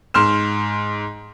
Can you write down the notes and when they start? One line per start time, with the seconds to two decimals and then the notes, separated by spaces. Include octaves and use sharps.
0.14 G#2 C6 F6 E7